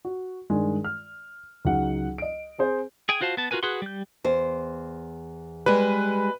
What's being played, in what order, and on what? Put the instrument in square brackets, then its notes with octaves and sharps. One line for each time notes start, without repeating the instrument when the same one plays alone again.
[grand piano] F#4
G2 D#3 G#3
F6
C#2 F#3 D#4 F#5
D#5 D7
C4 G#4 C5
[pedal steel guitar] G#4 G5 G#5
F4 F#4 C5 F5 A5
B3 A5
F4 F#4 A#4 B4 G#5
F#4 G#4 B4 F#5 C6
G3 G6
[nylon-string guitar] E2 C5
[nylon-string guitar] G3 G#3 [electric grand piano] B4